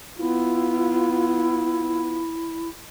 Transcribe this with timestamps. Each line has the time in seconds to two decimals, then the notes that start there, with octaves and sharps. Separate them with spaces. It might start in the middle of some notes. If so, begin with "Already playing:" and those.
0.19 B3 E4 F4